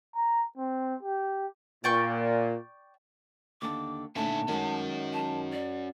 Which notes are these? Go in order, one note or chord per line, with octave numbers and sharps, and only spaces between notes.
A#5
C4
G4
A#2 D5 G5 C#6
D#2 D3 A5 D6
A#2 D3 A3 C#4 D#4 E5 A5
D#3 G#3 C#4 F#4
A5
D5